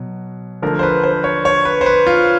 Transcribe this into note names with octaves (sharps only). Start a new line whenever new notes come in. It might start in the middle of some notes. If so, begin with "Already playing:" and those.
Already playing: B2 F#3
D3 F3 A3 A#4
C5
B4
C5
C#5
C#5
B4
C5
B4
F4